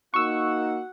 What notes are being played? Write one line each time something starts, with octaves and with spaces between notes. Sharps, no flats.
A#3 D#4 F#4 F#5 C#6 E6